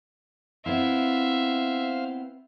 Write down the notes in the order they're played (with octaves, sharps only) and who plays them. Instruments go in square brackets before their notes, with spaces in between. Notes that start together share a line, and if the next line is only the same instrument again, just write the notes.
[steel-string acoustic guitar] B3 C4 E4 [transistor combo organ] C5 F5 [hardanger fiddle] E5